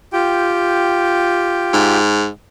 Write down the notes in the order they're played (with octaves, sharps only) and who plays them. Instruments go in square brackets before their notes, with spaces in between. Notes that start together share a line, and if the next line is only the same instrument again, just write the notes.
[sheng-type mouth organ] F4 G4 G5
[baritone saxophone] G#2